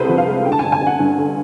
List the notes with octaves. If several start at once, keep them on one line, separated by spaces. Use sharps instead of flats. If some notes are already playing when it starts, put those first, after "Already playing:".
Already playing: C2 C3 G#3 A4 B4 C5
F3
F5
G#3
D3 G5
A5
G#5
G1
G#5
G1
F#5
G2
D3